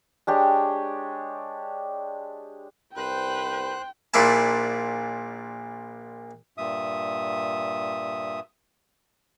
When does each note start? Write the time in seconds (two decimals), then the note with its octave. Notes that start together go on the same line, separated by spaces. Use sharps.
0.27 G#3 D4 G4 C#5
2.97 C2 B4 C5 G5 F#6
4.14 A#1 A#2 D4 E4 A5
6.58 G2 A#2 E5 D#6